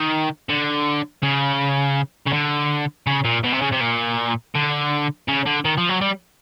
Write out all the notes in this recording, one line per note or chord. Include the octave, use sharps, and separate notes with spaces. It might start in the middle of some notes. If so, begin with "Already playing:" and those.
Already playing: D#3
D3
C#3
C#3
D3
C#3
A#2
B2
C3
C#3
C3
A#2
D3
C#3
D3
D#3
F3
F#3
G3